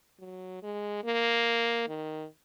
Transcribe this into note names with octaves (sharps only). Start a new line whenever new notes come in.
F#3
G#3
A#3
D#3